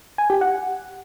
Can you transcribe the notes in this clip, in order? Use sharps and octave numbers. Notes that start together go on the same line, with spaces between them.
G#5
G4
F#5